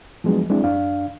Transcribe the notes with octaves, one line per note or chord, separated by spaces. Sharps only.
F3 F#3 G#3 B3 D4
F#3 G#3 C4 D4 E4
F#2 D4 F5